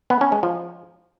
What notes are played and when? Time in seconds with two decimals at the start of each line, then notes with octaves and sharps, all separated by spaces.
0.10 B3
0.21 C#4
0.32 G#3
0.43 F3